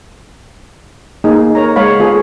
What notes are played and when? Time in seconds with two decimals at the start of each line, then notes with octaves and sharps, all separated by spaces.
1.24 A#3 D#4 G#4
1.55 A#4 C#5 A#5
1.76 G#3 C#5 F5 F#5 B5
1.99 B3 F4 G#4 A4 C#5